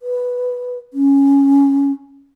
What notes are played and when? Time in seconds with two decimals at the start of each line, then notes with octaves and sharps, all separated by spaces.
0.01 B4
0.94 C#4